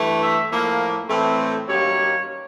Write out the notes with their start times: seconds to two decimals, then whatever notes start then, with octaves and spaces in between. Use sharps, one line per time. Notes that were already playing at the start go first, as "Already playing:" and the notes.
Already playing: G2 E3 A3
0.21 E5
0.51 A2 F3 A#3
1.09 A2 E3 A3 C4
1.68 F#2 D#3 G3 A#3 C#5